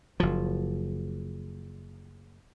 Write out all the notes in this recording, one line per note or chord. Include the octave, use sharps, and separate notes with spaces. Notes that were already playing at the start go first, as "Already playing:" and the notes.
F#1 F3